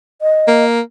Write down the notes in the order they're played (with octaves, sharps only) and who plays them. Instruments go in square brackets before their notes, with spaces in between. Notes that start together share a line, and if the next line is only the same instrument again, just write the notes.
[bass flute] D#5
[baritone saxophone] A#3